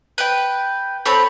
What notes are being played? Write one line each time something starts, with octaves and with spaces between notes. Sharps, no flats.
B4 G5
C4 A4 C#5 B5